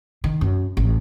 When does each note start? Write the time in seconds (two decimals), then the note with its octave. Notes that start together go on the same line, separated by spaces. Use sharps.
0.24 D#3
0.41 F#2
0.77 A1